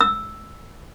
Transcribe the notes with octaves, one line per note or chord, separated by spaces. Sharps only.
E6